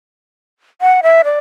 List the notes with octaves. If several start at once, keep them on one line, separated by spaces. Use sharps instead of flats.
F#5
E5
D5